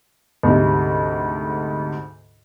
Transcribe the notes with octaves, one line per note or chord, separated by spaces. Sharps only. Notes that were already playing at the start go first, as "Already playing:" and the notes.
D2 G#2 C3